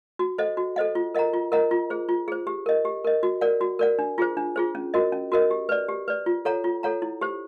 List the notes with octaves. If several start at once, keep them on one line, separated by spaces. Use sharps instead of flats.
F#4
A4 C5 D#5 F#5
F#4
A4 C5 D#5 F#5
F4
A#4 D#5 F#5 A#5
F4
A#4 D#5 F#5 A#5
F4
G#4 C5
F4
G#4 C5
G4
A#4 D#5
G4
A#4 D#5
F#4
A#4 D5 F#5
F#4
A#4 D5 F#5
D4
F4 G#4 C5
D4
F4 G#4 C5
C#4
F#4 A#4 D#5
C#4
F#4 A#4 D#5
G4
B4 D5
G4
B4 D5
F4
A4 C#5 F#5 A#5
F4
A4 C#5 F#5 A#5
E4
G4 C5